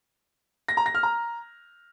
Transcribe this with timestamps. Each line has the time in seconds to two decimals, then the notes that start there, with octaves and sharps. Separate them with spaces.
0.68 A#6
0.77 A#5
0.86 A#6
0.94 F6
1.03 A#5